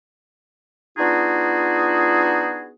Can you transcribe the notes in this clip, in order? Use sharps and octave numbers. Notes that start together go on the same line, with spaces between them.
B3 D4 D#4 F4 F#4 G#4